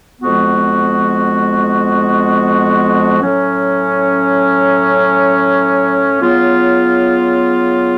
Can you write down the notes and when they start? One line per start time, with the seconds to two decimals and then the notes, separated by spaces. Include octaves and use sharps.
0.21 F2 F3 G#3 B3 F#4
3.20 A2 F#3 C#4
6.20 C#3 F#3 B3 F4